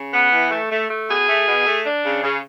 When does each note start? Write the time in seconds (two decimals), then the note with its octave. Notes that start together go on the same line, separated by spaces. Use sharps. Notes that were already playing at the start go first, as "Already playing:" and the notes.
Already playing: C#3
0.13 B3
0.32 E3
0.51 A3
0.71 A3
0.89 A3
1.09 B2 G#4
1.28 A3
1.47 B2
1.66 A3
1.85 D4
2.05 C#3
2.23 C#3